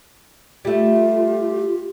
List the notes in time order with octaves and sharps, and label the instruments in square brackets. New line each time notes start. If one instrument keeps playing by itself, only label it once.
[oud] G3 A3 [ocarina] F4 [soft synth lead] G4